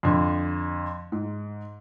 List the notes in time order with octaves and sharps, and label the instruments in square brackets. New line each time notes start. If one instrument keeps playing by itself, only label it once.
[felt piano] F2 D3
G#2